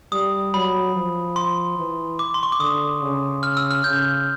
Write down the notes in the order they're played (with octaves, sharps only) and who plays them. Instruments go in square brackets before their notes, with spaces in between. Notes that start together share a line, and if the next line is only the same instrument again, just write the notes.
[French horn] G3 [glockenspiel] D#6
[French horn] F#3 [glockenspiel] B5
[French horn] F3
[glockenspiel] C6
[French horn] E3
[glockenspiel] D6
C6
C#6
D6
[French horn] D3 [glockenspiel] D#6
[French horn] C#3
[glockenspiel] F6
E6
F6
[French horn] C#3 [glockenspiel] G6